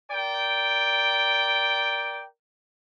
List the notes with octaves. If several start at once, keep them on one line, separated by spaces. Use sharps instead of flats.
A#4 D5 G5